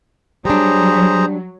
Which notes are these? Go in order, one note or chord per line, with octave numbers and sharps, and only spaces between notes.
F#3 G3 D4 G#4 C5 A#5